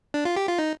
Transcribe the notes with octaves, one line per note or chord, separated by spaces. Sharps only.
D4
F4
G4
F4
D#4